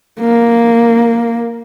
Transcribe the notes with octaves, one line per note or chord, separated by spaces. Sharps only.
A#3